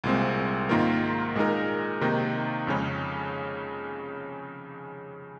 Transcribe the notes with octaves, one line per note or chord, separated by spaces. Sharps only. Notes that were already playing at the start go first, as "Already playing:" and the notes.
C2 A#2 G#3 C4
G#2 D#3 A#3 F4 A#4
A#2 G#3 D#4 A#4
C3 D#3 A#3 D#4
F2 C#3 G#3 C#4